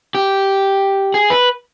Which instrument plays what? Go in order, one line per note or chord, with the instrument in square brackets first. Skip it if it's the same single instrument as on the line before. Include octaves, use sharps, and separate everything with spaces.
[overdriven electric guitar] G4
G#4
B4